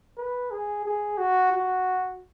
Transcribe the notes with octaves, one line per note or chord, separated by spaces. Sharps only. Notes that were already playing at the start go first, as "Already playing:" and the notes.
B4
G#4
G#4
F#4
F#4